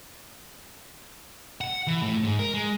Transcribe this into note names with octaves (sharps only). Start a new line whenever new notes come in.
F#5
E3
A2
G#2
A#4
G#3